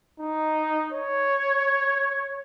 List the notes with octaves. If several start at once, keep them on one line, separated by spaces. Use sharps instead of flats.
D#4
C#5